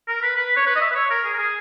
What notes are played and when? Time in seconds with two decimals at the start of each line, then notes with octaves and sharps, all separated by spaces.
0.08 A#4
0.23 B4
0.36 B4
0.57 C#5
0.66 B4
0.76 D#5
0.81 E5
0.91 B4
0.95 C#5
1.11 A#4
1.25 G#4
1.34 A#4
1.39 G#4